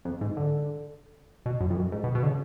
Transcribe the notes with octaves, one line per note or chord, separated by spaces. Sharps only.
F2
G#2
D3
B2
F#2
F2
F#2
G#2
B2
B2
D3
C#3